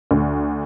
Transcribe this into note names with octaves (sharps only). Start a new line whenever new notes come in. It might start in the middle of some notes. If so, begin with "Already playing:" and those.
D2